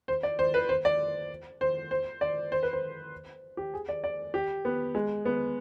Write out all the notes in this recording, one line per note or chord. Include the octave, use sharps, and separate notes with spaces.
C5
D5
C5
B4
C5
D5
C5
C5
D5
C5
B4
C5
G4
G#4
D5
D5
G4
B3
G#3
B3